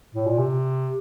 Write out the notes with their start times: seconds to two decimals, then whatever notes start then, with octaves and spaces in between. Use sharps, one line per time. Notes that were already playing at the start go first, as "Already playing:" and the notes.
0.15 A2
0.27 A#2
0.39 C3